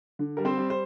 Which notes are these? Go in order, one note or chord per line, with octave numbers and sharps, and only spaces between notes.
D3
G3 A#4
C4 C5
G3
C5